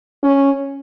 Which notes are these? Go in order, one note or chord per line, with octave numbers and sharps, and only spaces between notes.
C#4